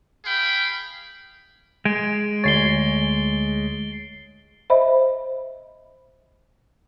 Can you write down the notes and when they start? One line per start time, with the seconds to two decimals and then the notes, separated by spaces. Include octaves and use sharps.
0.24 G#4 F5 G5 B5
1.85 G#3 D7
2.44 D2 C#5 A6 C7 G7
4.70 C5 D#5 E5 B5